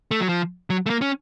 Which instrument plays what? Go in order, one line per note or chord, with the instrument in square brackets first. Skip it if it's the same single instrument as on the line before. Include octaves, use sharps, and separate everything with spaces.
[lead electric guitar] A3
F#3
F3
F#3
A3
A#3
C#4